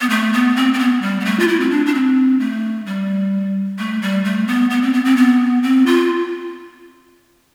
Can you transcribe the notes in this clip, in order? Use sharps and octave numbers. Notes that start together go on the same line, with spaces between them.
B3
A3
B3
C4
C4
B3
G3
B3
A3
F4
E4
C4
D4
D4
C4
A3
G3
A3
G3
A3
B3
B3
C4
B3
C4
B3
C4
F4